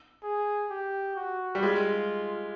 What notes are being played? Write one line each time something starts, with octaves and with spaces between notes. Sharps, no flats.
G#4
G4
F#4
G3
G#3 F4